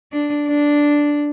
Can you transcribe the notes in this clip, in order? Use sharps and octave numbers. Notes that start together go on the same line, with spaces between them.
D4
D4